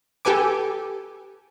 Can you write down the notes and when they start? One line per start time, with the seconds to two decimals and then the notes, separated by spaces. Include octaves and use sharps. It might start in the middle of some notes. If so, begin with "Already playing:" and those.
0.25 G4 A4 B4 G#5 D6